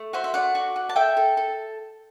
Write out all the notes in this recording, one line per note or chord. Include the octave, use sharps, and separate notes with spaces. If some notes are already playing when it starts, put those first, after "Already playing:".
Already playing: A3
F#4 C5 E5
E5
A3 D5 F#5
F#4
F#4
A5
A4 E5 G5
A4
A4